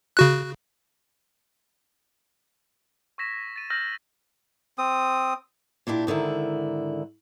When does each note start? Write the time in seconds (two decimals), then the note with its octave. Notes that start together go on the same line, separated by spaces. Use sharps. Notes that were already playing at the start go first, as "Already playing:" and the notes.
0.17 C#3 F#4 F#6
3.18 C#6 E6 G#6 A#6 B6 E7
3.56 A6 D#7
3.70 E6 F6 G6 A#6 F#7
4.78 C4 D#6
5.87 A#2 D4 E4 G4
6.07 G#2 D3 D#3 E4